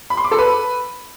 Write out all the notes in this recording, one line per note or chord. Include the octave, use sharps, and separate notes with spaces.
B5
C6
D6
A4
B4